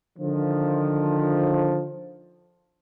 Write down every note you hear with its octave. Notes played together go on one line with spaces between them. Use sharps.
D3 D#3 F3